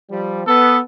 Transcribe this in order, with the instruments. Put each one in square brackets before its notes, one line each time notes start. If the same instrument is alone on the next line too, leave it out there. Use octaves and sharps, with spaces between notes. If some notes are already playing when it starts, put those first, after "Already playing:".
[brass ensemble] F3 G3
[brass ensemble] B3 [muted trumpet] A4